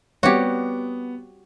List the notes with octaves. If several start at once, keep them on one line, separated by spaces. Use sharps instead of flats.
G3 B3 C4 F#4 G4 C#5